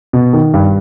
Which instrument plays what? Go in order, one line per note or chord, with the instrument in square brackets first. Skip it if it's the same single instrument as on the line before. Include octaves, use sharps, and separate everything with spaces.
[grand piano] B2
D#3
G2